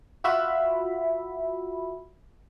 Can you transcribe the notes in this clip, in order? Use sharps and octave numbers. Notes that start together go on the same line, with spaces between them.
F4 F#4 E5 B5